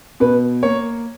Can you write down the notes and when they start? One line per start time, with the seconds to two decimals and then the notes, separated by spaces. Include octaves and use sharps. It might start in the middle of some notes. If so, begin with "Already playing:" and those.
0.20 B2 B4
0.63 A#3 C#5